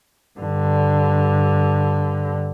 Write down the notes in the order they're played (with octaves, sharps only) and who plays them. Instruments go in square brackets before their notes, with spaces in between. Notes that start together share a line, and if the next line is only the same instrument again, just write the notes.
[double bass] G2 D3